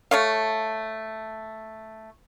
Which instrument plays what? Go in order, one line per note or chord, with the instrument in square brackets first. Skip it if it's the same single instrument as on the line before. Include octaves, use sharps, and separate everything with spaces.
[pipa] A3 C#5 F5